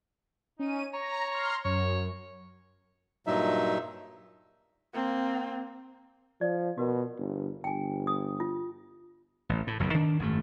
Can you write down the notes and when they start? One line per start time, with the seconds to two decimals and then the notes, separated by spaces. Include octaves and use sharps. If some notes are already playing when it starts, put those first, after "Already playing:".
0.59 C#4 D#4 D#7
0.93 C#5 A#5
1.31 A#5 C6 F6
1.65 F#2 C#5
3.27 G2 A#2 F#3 D#4 E5
4.94 A#3 C4
6.41 F3 D5
6.78 B2 F#4 A#4
7.18 G1
7.64 G1 G5 G#5
8.07 D#6
8.40 F4
9.49 A1
9.67 A2
9.80 F#1 B1 E2 B2
9.94 D#3 D4
10.19 G#1 F#2 B2 A3